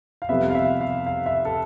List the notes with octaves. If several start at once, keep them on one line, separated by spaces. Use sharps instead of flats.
F5
F2 C3 G3 B3 E5
F5
E5
F5
F5
E5
A4